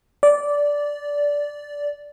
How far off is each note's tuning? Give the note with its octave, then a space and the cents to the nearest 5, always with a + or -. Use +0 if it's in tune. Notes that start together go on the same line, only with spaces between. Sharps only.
D5 -10